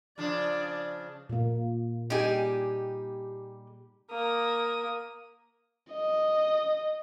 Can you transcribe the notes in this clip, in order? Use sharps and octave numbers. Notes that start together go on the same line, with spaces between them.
C#3 F3 D4 D5
A#2 A#3
G3 D#4 G4 G#4 G#5
A#3 D#6
D#5